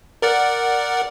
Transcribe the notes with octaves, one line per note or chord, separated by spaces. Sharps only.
A#4 D5 F#5